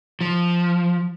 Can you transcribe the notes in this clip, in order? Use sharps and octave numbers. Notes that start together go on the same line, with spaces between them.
F3